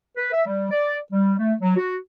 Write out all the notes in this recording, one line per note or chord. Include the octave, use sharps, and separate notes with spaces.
B4
E5
G3
D5
G3
A3
F#3
F#4